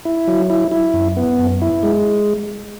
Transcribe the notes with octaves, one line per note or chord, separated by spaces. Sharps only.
E4
F#3
E4
E4
F#2
B3
F#2
E4
G#3